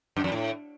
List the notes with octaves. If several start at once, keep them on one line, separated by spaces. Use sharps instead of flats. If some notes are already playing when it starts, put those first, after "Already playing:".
F#2
F2
A2